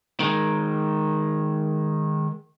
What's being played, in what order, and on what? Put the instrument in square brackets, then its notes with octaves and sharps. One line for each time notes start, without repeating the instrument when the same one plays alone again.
[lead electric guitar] D#3 G#3